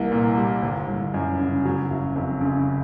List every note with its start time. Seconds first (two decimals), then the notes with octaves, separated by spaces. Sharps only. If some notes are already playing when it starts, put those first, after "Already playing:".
Already playing: C2 E3 A#3
0.12 A#2
0.38 G3
0.62 G1
0.88 G1
1.14 F#2
1.39 C#3
1.65 F#3
1.90 F#1
2.16 F2
2.41 C#3